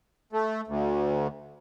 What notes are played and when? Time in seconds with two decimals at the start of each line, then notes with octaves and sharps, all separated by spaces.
0.33 A3
0.67 D2